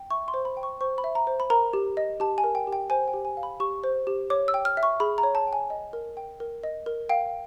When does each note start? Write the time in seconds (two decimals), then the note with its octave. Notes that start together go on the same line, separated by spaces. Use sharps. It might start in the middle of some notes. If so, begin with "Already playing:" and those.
Already playing: G5
0.10 E5 C#6
0.28 C6
0.34 C5
0.45 B5
0.57 G5
0.63 C#6
0.81 C5 C#6
0.98 B5
1.04 E5
1.15 A#5
1.27 C5
1.40 B5
1.50 A#4 A#5
1.73 G4
1.97 D#5
2.20 G4 A5
2.38 G#5
2.44 A#4
2.55 G5
2.67 G4
2.73 G5
2.90 C5 G#5
3.08 G5
3.14 G4
3.25 G#5
3.37 F5
3.43 B5
3.60 G4 C#6
3.84 C5
4.07 G4
4.30 C#5 D6
4.48 E6
4.54 G5
4.65 F6
4.77 E5
4.83 C#6
5.00 G#4 B5
5.18 A#5
5.23 C#5
5.35 A5
5.47 G5
5.53 G#5
5.70 D#5
5.93 A#4
6.17 G5
6.40 A#4
6.63 D#5
6.86 A#4
7.09 F5 G5